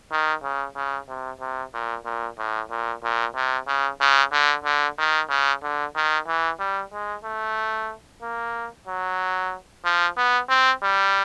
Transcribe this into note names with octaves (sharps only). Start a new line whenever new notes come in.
D#3
C#3
C#3
C3
C3
A#2
A#2
A2
A#2
A#2
C3
C#3
C#3
D3
D3
D#3
C#3
D3
D#3
E3
G3
G#3
A3
A#3
F#3
F3
B3
C4
G3